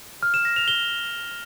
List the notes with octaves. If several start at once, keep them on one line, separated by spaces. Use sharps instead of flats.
F6
E7
A#6
F7
G7